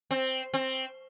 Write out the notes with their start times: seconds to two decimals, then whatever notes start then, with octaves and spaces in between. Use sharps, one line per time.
0.11 C4
0.54 C4